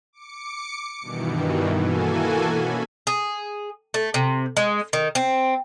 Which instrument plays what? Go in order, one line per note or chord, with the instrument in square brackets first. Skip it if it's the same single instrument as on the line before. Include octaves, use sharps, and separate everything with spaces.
[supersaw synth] D6 C#7
G2 B2 D#3 E3
E3 A#3 F#4 A4 G#5
B2 C#4 B5
[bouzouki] G#4
A3
C3
G#3
D#3
C4